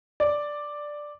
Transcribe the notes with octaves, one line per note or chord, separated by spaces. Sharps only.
D5